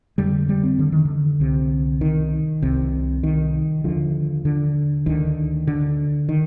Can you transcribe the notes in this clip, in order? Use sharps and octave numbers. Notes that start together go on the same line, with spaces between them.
F2 D3 G3
G3
C4
D3
D#3
D3
C2 C3
D#3
C2 C3
D#3
D#2 D3 F3
D3
D2 D3 D#3
D3
D#3